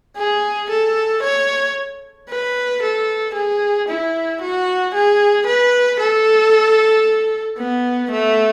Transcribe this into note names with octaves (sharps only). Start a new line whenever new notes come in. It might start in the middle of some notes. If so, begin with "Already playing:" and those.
G#4
A4
C#5
B4
A4
G#4
E4
F#4
G#4
B4
A4
B3
A3